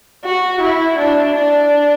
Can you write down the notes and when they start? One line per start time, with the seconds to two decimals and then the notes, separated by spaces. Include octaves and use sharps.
0.25 F#4
0.61 E4
0.98 D4
1.36 D4